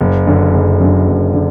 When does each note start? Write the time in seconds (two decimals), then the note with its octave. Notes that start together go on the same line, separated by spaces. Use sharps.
0.01 F#1
0.27 F#2 D3
0.54 F#1
0.80 F#2 D3
1.07 F#1
1.34 D3